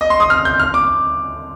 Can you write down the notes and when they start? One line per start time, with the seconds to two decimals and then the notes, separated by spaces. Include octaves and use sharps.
0.01 D#5
0.10 C6
0.20 D#6
0.30 F6
0.45 G6
0.60 F6
0.74 D6